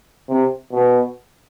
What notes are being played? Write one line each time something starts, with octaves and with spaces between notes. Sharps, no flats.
C3
B2